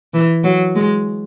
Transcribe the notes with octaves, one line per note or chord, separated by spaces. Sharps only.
E3
F#3
G#3